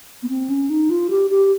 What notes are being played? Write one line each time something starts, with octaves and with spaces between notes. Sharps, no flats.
B3
C4
C#4
D#4
F4
G4
G4